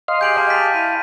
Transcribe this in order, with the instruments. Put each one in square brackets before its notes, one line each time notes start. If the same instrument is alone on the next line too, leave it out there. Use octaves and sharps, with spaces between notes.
[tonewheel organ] D#5 F5 C6
[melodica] G4 G#4 G#5 [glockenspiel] G6 D7 F#7
[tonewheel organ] F5 [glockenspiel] A5
[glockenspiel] C6 A6 B6
[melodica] E4 [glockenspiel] D#7